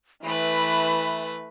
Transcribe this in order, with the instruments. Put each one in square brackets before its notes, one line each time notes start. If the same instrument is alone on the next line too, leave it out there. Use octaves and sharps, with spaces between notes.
[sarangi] E3 [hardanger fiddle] A3 B4 [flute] B5